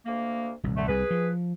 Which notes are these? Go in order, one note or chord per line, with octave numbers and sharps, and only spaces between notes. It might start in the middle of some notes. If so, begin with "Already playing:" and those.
D2 A#3
D#1 C2
D3 A3
C2 G#4 B4
F3